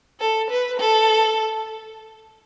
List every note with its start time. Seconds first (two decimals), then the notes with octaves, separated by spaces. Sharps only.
0.20 A4
0.50 B4
0.80 A4